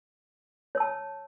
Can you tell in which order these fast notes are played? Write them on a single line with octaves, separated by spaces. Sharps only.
C#5 E6 A5